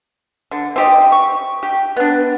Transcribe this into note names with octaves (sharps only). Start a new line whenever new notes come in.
D3
C4 G4 D#5
C#6
G4
B3 D4